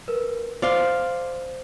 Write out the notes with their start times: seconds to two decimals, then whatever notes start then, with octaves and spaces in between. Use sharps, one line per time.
0.08 A#4 B4
0.62 C5 D5 F5 C6